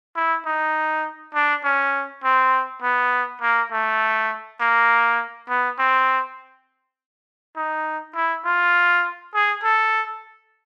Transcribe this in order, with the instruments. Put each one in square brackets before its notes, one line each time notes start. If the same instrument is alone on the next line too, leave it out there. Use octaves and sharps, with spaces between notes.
[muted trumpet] E4
D#4
D4
C#4
C4
B3
A#3
A3
A#3
B3
C4
D#4
E4
F4
G#4
A4